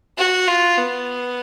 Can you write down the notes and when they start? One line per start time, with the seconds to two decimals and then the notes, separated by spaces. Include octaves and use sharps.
0.18 F#4
0.48 F4
0.78 B3